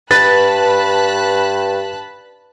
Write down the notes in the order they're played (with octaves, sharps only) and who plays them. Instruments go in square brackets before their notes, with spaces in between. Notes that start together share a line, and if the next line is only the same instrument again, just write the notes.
[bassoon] G2 [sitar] B4 [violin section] A5 B5 F#6 [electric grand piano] A6